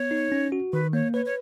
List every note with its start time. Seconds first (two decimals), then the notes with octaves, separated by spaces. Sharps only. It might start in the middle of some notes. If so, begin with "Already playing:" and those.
Already playing: B3 C#5
0.11 D#4
0.32 C#4
0.52 F#4
0.73 D#3 B4
0.93 A#3 C#5
1.14 B4 C#5
1.26 C#5